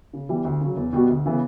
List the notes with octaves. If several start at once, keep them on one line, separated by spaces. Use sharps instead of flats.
C#3
E3 G3 B3
D2
C#3 F#3
E2
B2 G3 B3 F#4
D2
C#3 E3 B3